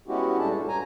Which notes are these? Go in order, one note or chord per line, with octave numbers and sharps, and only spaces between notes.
G#3 B3 C#4 E4 F#4 G4
A#2 G3 D4 A4 A5
G2
G#5 A#5